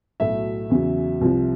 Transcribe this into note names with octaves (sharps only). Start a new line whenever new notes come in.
B1 A2 F#3 A3 E5
E2 C#3 F#3
C2 C3 F3